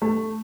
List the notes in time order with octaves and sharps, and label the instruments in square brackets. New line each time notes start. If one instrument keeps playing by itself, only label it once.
[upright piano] A3